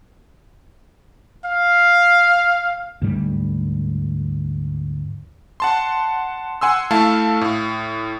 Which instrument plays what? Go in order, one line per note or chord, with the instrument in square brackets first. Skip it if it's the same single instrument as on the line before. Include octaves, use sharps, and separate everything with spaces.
[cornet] F5
[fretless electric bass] D2 G#2 G3
[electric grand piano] F#5 A5 C6
F#5 G#5 C6 E6
A3 E4 A4 F5 A5
A2